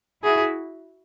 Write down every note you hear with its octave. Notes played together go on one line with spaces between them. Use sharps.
E4 F#4 G#4